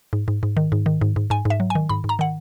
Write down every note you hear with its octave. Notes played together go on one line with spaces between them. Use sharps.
G#2
G#2
G#2
D#3
G#2
D#3
G#2
G#2
G#2 G#5
G#2 E5
F#3
G#5
D#3
G#2 B5
G#2
A#5
D#3 F#5